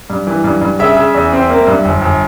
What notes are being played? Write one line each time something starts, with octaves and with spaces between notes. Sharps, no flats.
G2
E3
G2
G2
C#3 E5
C#3
E2
C4
A#3
G2
G1
G1